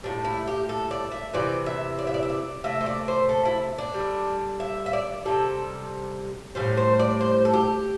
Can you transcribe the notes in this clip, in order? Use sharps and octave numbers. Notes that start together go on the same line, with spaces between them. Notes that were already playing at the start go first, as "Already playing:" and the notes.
A2 E3 G3 D4
E4
G4
A4
D5
E5
C3 E3 D5
E5
D5
E5
D5
E5
D5
C3 A3 E5
C5
D5
C5
A4
E4
D4
G3
D3
E5
E5
D5
C3 G3 A4
E3 G3 C5
A2
C5
D5
C5
A4
G4